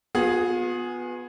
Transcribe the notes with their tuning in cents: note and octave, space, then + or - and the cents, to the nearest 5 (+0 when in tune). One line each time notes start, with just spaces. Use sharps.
B3 +0 F4 +40 G#4 +0